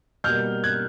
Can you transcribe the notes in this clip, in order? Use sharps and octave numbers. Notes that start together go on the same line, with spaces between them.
B2 G3 A#3 F6 G6
F#6 G#6